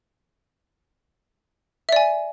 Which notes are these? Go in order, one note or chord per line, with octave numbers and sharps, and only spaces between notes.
D5 E5 G#5